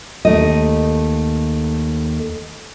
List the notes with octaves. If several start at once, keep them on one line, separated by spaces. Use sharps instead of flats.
D#2 A3 D#5